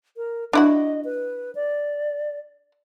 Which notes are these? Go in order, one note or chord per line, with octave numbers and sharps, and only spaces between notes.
A#4
D4 E4 F#4 D#5
B4
D5